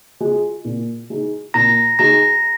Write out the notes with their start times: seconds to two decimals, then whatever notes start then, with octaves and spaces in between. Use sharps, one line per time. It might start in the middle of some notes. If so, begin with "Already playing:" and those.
0.20 G#3 F4
0.65 A#2
1.10 G#3 D#4
1.54 A#2 A#5 A#6
1.99 G#3 D#4 A#5 A#6